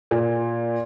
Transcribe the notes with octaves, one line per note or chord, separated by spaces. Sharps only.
A#2